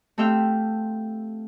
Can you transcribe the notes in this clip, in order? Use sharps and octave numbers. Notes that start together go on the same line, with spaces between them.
A3 C4 G4 E5 F5 G5